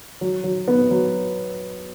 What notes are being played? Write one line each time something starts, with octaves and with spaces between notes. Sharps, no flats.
F#3
F#3
B3
F#3